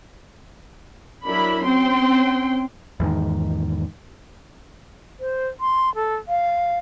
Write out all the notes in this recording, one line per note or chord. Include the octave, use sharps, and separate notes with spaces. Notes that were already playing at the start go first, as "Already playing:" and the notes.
F#3 D4 E4 A#4 B5
C4 C#4 G5 C6
E2 G#2 D#3
C5
C6
A4
F5